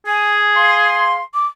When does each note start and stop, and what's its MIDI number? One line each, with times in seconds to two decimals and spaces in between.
0.06 1.19 68
0.06 0.36 80
0.55 1.19 77
0.55 1.22 84
1.34 1.46 86